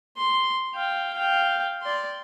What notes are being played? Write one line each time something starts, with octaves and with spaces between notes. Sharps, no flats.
C6
F5 G5
F5 G5
D5 C6